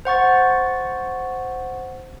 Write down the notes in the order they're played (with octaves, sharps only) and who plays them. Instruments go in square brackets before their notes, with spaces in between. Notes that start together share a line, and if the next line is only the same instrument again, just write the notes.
[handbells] C5 F#5 C#6 A6